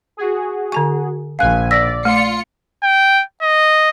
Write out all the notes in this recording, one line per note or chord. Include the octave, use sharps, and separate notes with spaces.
F#4 G#4
D3 G#5 A5 C#6
A#1 F5 G#5 F#6
D5 E6 A#6 B6
A3 F4 C#7
G5
D#5